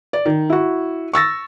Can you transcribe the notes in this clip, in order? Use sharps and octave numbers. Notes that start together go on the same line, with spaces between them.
D5
D#3
E4 F#4
C#6 E6 A6 A#6